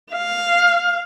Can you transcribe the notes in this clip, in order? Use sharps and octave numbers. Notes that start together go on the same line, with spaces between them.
F5